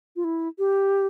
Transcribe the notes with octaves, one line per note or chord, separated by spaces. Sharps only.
F4
E4
G4